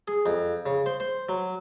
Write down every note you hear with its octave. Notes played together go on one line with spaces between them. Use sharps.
G#4
F2
C#3
C5
C5
F#3